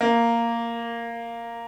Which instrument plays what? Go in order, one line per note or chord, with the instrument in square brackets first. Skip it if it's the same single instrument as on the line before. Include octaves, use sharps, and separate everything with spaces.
[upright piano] A#3